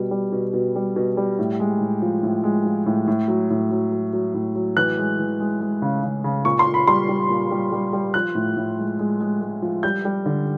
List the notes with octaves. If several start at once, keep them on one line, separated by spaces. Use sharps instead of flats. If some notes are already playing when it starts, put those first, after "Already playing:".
Already playing: B2 G3
G3
B2
B2
G3
B2
G3
A2
G#3
A2
F3
A2
G#3
F3
A2
A2
F#3
A2
F#3
F#3
F#3
A2
F#3
E3 F#6
G#3
E3
G#3
G#3
C#3
C#3
C#3
A#2 C#6
C6
A#2
B5
G3 C6
G3
A#2
G3
G3
G3
F3 F#6
A2
A2
G#3
G#3
G#3
G#3
F3
G3 G6
G3
D3